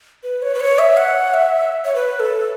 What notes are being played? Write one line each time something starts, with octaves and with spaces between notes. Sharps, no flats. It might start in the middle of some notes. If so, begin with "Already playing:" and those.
B4
C#5
B4
C#5
E5
F#5
E5
C#5
B4
A4